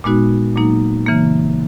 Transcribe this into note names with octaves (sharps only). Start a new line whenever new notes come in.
A#2 G#3 B3 D#4 F#4
A#2 F#3 A#3 D#4
C#3 E3 A#3